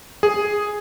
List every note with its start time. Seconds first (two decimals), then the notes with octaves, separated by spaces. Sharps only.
0.23 G#4